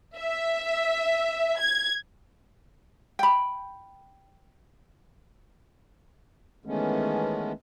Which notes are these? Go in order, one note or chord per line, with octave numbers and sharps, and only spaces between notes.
E5
G#6
G5 B5
D#3 E3 G#3 A3 B3 C#4